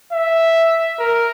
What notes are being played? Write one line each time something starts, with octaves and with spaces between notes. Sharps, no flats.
E5
A#4